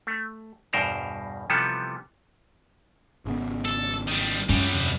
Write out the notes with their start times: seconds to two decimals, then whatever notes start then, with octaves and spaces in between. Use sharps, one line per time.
0.07 A3
0.73 E2 G2 B2 A#4 C5 A#5
1.50 C3 E3 F3 G3 B3 A4
3.25 G#1 C#3 B3
3.65 A4
4.08 D#3 G3
4.49 F#2 G3 G#3 B3 C#4
4.73 E2 C3